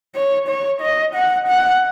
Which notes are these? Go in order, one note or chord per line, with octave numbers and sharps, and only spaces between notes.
C#5
C#5
D#5
F#5
F#5